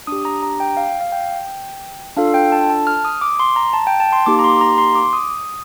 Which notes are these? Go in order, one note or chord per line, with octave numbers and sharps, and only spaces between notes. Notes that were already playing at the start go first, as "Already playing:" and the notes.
D4 G4 D#6
A#5
A#5
G5
F5
F5
G5
D4 F4 A4 F5
G5
A5
A5
F6
D#6
D6
C6
A#5
A5
G5
A5
C6
A#3 D#4 G4 D6
A#5
C6
A#5
C6
D6
D#6